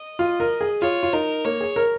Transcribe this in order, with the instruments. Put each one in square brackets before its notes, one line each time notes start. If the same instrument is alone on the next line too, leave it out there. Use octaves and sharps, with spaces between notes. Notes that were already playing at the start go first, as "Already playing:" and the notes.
Already playing: [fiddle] D#5
[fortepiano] F4
A#4
G#4
[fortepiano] F4 [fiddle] C#5
[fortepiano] F4
[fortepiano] D#4 [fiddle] A#4
[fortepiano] A#3 [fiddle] C#5
[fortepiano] G#4
A#4